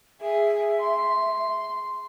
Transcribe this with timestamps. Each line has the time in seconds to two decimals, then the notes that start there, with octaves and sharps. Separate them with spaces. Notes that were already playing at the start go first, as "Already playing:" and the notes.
0.21 G#4 E5
0.80 C6